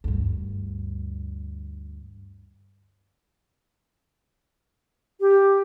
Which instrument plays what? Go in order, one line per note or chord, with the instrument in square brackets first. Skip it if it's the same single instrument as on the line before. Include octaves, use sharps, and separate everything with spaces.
[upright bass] D2 G2
[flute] G4